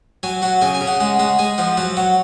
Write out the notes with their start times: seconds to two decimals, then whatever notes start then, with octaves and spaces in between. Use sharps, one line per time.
0.23 F#3 G#5
0.42 F#3 F#5
0.62 C#3 G#5
0.75 G#5
0.81 C#3
0.87 F#5
1.00 G#3 F#5
1.19 G#3 F#5
1.39 G#3 G#5
1.58 F3 F#5
1.77 F#3 F#5
1.97 F#3 F#5